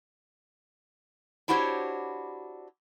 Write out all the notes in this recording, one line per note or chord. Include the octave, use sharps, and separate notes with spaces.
D4 E4 F#4 G4 C5 C#5